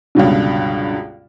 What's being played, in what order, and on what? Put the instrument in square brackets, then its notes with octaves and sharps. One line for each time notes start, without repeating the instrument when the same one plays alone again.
[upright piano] C#2 G2 B2 D3